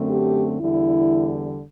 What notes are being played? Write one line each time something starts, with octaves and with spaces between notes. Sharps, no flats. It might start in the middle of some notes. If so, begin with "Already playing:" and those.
Already playing: F#2 D3 A3 C4
G4
E2 D3 G3 E4